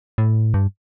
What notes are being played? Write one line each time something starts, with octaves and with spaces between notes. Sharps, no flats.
A2
G2